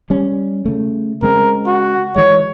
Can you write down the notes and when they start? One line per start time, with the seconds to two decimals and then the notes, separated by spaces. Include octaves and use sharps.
0.10 G3 C#4
0.65 C#3 A3
1.22 C#3 G#3 C4 A#4
1.67 F#4
2.16 E3 G#3 C#5